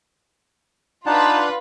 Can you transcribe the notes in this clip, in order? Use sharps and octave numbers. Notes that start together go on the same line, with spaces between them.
D4 D#4 F4 B4 F#5 A5